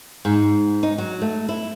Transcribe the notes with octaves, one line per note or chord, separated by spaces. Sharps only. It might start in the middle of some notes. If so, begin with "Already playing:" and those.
G#2
D#4
F#3
A3
E4